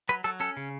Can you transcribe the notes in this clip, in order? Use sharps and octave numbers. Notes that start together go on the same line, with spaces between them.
F#3 B4
F#3 A4
C#4 A4
C#3